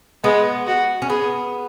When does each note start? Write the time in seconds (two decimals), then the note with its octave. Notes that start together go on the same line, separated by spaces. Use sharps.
0.24 G#3 B3
0.67 F#4
1.02 C#4
1.10 B3 G#4